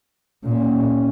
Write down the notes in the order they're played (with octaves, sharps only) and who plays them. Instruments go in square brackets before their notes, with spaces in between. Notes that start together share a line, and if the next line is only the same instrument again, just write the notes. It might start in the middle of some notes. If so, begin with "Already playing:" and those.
[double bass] A#2 [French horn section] C#4